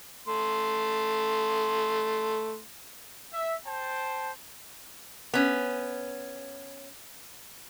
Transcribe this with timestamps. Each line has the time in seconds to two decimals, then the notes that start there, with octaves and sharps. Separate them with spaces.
0.27 A3 C6
3.33 E5
3.66 C5 G5 A5
5.34 B3 C#4